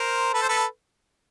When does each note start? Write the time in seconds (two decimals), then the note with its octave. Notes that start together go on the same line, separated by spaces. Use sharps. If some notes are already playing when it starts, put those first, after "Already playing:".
Already playing: A#4 C5
0.34 A4 B4
0.42 C5
0.49 A4 B4